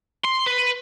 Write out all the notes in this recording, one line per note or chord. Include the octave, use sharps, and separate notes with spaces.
C6
B4